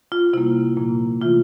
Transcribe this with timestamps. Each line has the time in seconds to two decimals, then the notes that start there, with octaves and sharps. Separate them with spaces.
0.12 F4
0.33 C3 G3 A#3 E4
0.77 A#2 F3 A#3
1.21 C3 E3 A3 F4